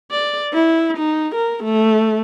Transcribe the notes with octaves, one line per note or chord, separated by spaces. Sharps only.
D5
E4
D#4
A#4
A3